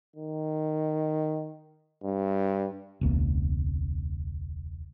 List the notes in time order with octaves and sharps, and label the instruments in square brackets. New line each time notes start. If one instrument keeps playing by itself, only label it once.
[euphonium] D#3
G2
[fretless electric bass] E1 C#2 A#3